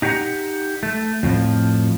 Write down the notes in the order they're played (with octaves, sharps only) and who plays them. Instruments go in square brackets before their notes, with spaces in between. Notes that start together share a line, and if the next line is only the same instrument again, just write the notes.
[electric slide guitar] D#4 G4 G#4 C#5 F#5 A#5
A3
F2 A2 F3